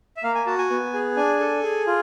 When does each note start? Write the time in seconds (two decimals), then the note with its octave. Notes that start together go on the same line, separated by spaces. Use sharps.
0.17 E5
0.23 A#3 F5
0.35 G#5
0.46 F#4 A5
0.59 G#5
0.70 B3
0.93 G#4
1.16 D4 G#5
1.40 A4
1.64 G#4
1.87 F4